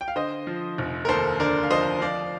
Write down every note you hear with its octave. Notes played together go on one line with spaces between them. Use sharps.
G5
F5
D3 C5 D#5
F3
F1
A#4
D#2 A4 C5
D3 A#4 D5
F5
F3 C5 D#5
F3 D5 F5